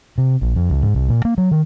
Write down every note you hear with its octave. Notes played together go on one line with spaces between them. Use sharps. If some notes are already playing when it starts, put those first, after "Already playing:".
C3
A#1
F2
C#2
G#2
C2
A#2
A#3
F#3
D#3